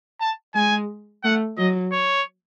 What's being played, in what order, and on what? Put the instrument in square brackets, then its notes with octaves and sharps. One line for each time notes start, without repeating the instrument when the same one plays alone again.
[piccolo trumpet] A5
[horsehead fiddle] G#3 [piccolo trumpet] G#5
[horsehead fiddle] A3 [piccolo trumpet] F#5
[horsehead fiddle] F#3 [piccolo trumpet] D#5
[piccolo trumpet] C#5